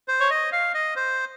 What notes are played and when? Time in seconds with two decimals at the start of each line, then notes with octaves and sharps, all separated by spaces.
0.08 C5
0.20 C#5
0.30 D#5
0.52 F5
0.74 D#5
0.96 C5